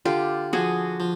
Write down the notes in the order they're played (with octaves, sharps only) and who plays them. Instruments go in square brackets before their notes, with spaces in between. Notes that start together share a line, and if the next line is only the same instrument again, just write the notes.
[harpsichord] D3 [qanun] F4 G4
[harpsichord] F3 [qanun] F#4 G#4
[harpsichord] F3